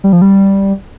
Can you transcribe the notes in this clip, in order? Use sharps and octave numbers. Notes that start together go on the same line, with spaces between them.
G3
F3
G3